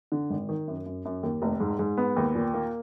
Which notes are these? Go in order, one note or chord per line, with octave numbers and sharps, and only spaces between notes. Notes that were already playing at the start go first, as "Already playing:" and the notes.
D3
G#1
D#3
F#2
F#2
F#2
D#2
F1
G#2
G#2
B3
D#2
A#2
A#3